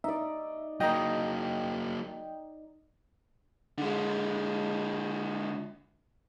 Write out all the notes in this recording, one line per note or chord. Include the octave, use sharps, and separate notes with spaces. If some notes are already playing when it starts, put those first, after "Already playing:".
D#4 D5 E5
F#3 A#3 D#5 G5 A#5
D3 G#3